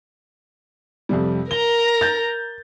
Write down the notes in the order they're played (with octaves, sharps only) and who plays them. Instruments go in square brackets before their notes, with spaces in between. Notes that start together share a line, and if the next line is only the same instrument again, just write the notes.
[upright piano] F2 C3 G3
[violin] A#4 A#5 [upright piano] G7
[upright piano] G6 A6